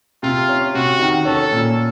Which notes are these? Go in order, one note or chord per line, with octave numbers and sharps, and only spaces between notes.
C3 F4
C#4
C3 F#4
D#3
C#4 A4
A#2